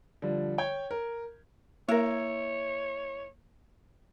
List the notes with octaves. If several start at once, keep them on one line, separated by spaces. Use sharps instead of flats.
D3 F3 G3
C#5 G5 G#6
A#4
A#3 E4 A#4 C#5